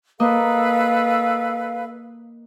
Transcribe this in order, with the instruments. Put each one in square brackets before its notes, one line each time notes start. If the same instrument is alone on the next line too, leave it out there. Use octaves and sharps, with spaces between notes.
[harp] A#3 D#5 [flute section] A4 B4 F5